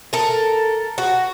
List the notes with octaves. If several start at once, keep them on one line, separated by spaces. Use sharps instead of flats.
A4 A#4
F#4